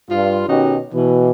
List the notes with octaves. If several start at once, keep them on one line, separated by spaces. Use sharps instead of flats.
G2 F4
B2 D#3 C#4 D#4 F#4 G4
B2 E3